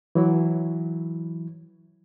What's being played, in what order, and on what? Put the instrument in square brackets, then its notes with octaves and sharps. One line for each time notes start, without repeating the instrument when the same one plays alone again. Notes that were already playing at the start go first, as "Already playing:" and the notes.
[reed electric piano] E3 F#3 E4